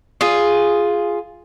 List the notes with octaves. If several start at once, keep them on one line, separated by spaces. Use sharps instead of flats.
F4 G#4